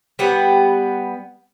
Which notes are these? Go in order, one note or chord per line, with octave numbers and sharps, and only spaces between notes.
G3 B3 F#5